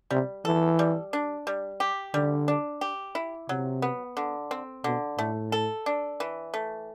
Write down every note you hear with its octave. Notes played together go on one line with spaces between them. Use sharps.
C3 G3
E3 A4
G3
D4
G3
G4
D3 G3
D4
G4
E4
C3 F#3
B3
D3
C4
B2 D3
A2 A3
A4
D4
E3
A3